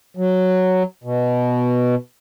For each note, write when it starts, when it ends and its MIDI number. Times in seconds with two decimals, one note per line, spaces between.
0.17 0.83 54
1.04 1.95 47